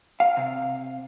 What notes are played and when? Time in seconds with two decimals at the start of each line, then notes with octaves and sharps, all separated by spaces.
0.20 F5
0.37 C3